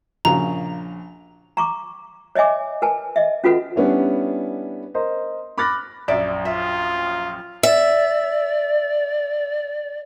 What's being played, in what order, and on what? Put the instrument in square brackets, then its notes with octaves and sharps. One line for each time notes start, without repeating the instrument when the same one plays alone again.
[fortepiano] A#1 C#3 F#4 [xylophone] A#5
[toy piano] A#5 C#6 D6
C#5 D#5 E5 G#5 D6
A#4 B4 G#5 A5
D#5 E5
C#4 F4 F#4 A4 B4 F#5
[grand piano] G3 B3 C#4 D4 E4
A#4 C5 D#5
B5 D6 F6 F#6 A6 A#6
[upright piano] A#1 F#2 [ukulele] D5 E5
[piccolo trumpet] F4 [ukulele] E5
[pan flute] D5 [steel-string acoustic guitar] E5